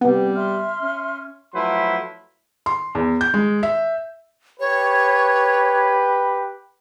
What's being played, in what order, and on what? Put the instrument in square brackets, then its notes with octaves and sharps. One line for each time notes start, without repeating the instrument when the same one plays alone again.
[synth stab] C3 B3 [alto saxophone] G3 [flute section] G4
[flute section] E5 C6 F6
[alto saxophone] C#4
[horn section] F3 F#3 A3 E4 B4 C6
[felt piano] C6
E2
G6
G#3
E5
[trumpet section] G4 B4 [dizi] C#5